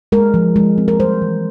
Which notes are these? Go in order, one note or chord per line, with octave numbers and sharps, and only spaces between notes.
G#3 A#4
F3
G#3
C4
A#4
G3 C5
E3